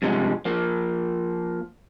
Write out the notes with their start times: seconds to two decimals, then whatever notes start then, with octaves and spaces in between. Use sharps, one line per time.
0.02 G2 C3 F3 G#3
0.45 F3 A#3